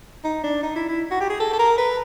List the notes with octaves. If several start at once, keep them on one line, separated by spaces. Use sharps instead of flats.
D#4
D4
D#4
E4
E4
F#4
G4
G#4
A4
A4
A#4
B4